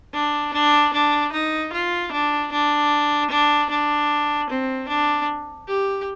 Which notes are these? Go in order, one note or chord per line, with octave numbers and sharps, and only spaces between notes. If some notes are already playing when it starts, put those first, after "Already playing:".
D4
D4
D4
D#4
F4
D4
D4
D4
D4
C4
D4
G4